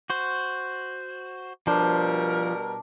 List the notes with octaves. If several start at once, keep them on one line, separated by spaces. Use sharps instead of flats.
F#4 C5
B2 F3 G3 D4 A#4 C5